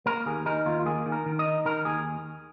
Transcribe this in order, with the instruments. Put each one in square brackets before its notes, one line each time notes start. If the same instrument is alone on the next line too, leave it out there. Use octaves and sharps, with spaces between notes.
[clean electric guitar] A#3 A#4
D#2 G#4
D#4 A#4
D#2 F4
F4
A#3 G#4
D#3
A#4
D#3
D#5
D#4
D#3 A#4
D#2 G#4